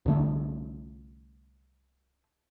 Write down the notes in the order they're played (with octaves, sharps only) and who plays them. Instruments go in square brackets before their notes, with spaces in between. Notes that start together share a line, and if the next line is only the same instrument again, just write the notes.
[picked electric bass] C2 D3 A3